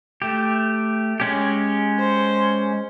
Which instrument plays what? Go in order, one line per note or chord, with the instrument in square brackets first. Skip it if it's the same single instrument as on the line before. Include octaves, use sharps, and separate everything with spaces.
[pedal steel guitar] A3 G4
G#3 C#4 G4
[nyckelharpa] C5